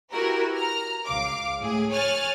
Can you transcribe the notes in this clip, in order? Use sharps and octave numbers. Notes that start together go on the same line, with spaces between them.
E4 F#4 G4 A#4 B4
A#5 F6
C#2 F5 D6
A2 G#4
C#5 G#5 F6 F#6 A6